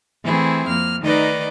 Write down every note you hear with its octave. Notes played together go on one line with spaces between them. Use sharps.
E3 A3 C4 E4 G#4
F2 A#3 F6
D#3 A3 D#4 B4 D5 D#5